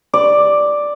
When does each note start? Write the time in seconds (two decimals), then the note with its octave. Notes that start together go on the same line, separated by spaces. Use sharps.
0.14 D5